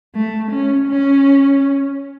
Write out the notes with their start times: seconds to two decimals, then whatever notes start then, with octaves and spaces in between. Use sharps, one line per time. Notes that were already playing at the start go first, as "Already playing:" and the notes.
0.15 A3
0.51 C#4
0.88 C#4